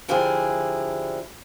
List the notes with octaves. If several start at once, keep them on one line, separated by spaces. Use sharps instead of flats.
D3 F3 D4 E4 G4 G#4